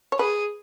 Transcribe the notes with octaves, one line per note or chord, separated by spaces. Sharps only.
C#5
G#4 B4